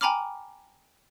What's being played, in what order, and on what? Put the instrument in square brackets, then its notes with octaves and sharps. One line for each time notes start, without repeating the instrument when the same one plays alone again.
[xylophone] G5 G#5 A#5 B5 D6 F6